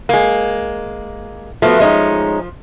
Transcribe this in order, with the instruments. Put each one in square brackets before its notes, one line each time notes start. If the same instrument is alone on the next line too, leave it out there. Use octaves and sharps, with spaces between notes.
[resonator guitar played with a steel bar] G#3 A#3
[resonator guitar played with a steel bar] F3 [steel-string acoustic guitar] A3 B3 F#4
[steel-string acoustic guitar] G#3 C#4 D#4